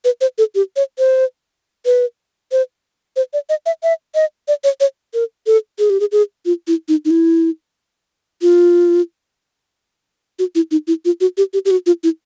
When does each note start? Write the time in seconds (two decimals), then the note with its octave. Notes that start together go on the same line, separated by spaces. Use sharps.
0.05 B4
0.21 C5
0.38 A4
0.55 G4
0.76 C#5
0.98 C5
1.86 B4
2.52 C5
3.16 C5
3.33 D5
3.49 D#5
3.66 E5
3.83 E5
4.15 D#5
4.48 D5
4.64 C#5
4.80 C#5
5.14 A#4
5.47 A4
5.79 G#4
5.90 G4
6.00 G#4
6.12 G#4
6.46 F4
6.67 E4
6.89 D#4
7.05 D#4
7.11 E4
8.42 F4
10.39 F#4
10.55 E4
10.71 D#4
10.87 E4
11.05 F4
11.21 F#4
11.38 G4
11.53 G4
11.65 G4
11.71 F#4
11.86 F4
12.03 E4